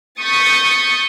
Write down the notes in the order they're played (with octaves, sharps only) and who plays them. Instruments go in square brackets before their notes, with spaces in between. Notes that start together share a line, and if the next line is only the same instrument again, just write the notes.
[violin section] C#6 D#6 G6 A6 B6 C#7